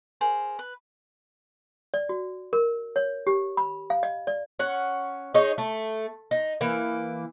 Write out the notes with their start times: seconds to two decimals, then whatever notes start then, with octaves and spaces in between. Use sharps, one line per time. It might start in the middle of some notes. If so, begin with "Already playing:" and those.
0.21 G#4 A#4 C5
0.59 B4
1.94 D5
2.09 F#4
2.53 A#4
2.96 C#5
3.27 G4
3.57 B5
3.90 F5
4.03 D#5
4.27 D5
4.59 C#4 F#5
5.34 D#4 G#4 C#5 D#5
5.58 A3
6.31 D#4
6.61 E3 A#3